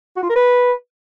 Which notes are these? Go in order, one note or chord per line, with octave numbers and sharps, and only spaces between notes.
F#4
F4
A#4
B4